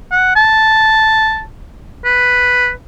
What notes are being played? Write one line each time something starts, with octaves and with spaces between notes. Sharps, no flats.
F#5
A5
B4